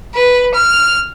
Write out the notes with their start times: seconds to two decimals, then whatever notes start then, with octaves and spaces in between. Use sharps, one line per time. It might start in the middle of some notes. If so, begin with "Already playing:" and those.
0.14 B4
0.53 F6